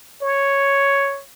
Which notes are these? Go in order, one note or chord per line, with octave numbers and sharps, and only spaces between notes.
C#5